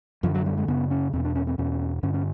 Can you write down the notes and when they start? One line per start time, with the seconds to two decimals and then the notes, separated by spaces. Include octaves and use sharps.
0.23 F#2 D3 F3
0.35 F#3
0.46 G3
0.58 G#3
0.68 F#2 C#3 B3
0.91 C#4
1.13 E2 B2 C4
1.25 D4
1.36 C#4
1.47 C4
1.58 E2 B2 C#4
2.03 G2 D3 C#4
2.14 C#4